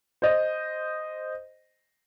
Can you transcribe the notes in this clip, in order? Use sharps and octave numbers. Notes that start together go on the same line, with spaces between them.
C5 D#5